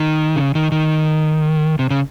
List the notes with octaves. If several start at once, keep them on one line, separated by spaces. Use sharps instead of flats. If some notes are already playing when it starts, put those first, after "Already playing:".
Already playing: D#3
C#3
D#3
D#3
C3
C#3